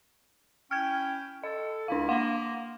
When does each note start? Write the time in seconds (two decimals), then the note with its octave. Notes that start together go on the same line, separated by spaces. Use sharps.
0.71 C#4 E4 G5 F6 G#6
1.43 A4 D#5
1.88 C#2 C#3 D4 E4 F5
2.09 A#3 F5 F#5 C6